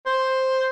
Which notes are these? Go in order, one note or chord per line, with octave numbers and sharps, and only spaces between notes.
C5